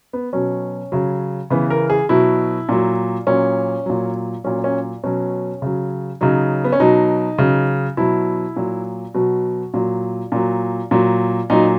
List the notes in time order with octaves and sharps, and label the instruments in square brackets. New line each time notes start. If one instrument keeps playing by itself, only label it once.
[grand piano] B3
B2 F#3 C#4
C#3 F#3
C#3 E3 B3
A#4
G#4
B2 F#3 E4
A#2 F#3
A#2 F#3 C#4
A#2 F#3
A#2 F#3 C#4
C#4
B2 F#3 C#4
C#3 F#3
C#3 F#3 D#4
B3
C#4
B2 F#3 D#4
C#3 F#3
B2 F#3 E4
A#2 F#3
B2 F#3 F#4
A#2 F#3
A#2 F#3
A#2 F#3
A#2 F#3 D#4